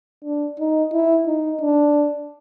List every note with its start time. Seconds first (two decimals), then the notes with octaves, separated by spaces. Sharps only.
0.24 D4
0.60 D#4
0.93 E4
1.27 D#4
1.61 D4